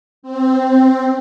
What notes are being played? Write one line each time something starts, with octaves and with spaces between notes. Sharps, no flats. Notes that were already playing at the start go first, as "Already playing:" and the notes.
C4